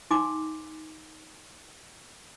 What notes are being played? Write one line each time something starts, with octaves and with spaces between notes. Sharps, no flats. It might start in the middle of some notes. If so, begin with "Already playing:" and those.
D#4 F5 G#5 C6 D6